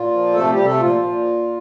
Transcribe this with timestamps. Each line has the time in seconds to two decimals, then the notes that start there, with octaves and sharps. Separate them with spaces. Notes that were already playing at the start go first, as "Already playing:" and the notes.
Already playing: A#2 F4
0.11 F3
0.33 C3 A3 A4
0.50 G3 G4
0.57 C3
0.64 A3 A4
0.80 A#2 F3 F4
1.04 A#2